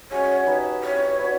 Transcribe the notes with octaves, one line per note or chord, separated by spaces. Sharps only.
G#3 C#4 F#4 C#5
D#4 G4 B4 E5
C4 E4 G4 B4 C#5
D4 F#4 B4 E5